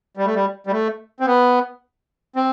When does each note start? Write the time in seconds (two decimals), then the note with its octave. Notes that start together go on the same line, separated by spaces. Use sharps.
0.17 G3
0.26 A3
0.34 G3
0.67 G3
0.71 A3
1.20 C4
1.26 B3
2.36 C4